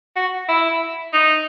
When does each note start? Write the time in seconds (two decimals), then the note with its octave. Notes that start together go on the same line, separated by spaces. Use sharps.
0.16 F#4
0.49 E4
1.13 D#4